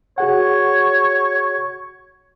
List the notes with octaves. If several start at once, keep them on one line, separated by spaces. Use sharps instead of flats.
F#4 G#4 C#5 F#5